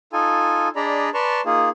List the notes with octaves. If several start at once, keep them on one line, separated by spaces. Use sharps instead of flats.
D#4 F4 A4 G#5
D4 G#4 D5 D#5 A#5 B5
B4 D5 A5 A#5 C6 C#6
A#3 D#4 F4 G#4